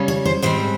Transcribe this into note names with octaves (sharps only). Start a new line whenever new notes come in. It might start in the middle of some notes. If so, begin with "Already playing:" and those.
Already playing: C#3 G3 C#4
C#5
C5
G#2 G3 C4 C5